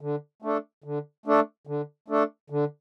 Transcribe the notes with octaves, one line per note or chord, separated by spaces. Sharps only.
D3
A3 D4 A4
D3
A3 D4 A4
D3
A3 D4 A4
D3